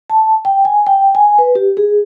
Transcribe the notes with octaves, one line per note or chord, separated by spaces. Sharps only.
A5
G5
G#5
G5
G#5
B4
G4
G#4